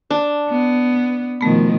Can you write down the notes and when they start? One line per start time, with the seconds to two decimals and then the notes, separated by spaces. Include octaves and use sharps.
0.10 D4
0.49 B3
1.41 B2 D#3 F3 A3 B3